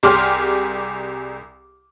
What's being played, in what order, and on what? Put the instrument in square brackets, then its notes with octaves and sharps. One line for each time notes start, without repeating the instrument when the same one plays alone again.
[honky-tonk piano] C2 G4 G#4 C6 D6 F6